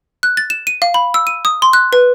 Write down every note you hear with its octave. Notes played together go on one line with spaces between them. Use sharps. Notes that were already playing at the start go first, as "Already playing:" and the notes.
F#6
A6
E7
D#7
F5
B5
E6
D#7
D#6
C6
F#6
B4